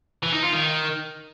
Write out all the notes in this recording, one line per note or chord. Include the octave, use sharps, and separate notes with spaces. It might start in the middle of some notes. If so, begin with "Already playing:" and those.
E3
D#4
F4
D#3